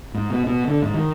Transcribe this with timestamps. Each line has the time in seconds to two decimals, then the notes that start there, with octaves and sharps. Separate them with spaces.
0.14 G#2
0.30 B2
0.46 B2
0.68 D3
0.82 G#2
0.94 D#3